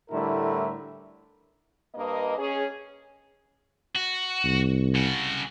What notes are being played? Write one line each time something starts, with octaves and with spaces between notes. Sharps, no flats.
A2 D3 G3 A3 E4 A#4
G2 A#3 B4 D#5
C#4 G#4
F#4
C2
C#3 F#4